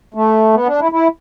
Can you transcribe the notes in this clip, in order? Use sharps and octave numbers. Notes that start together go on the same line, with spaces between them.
A3
B3
D4
E4
E4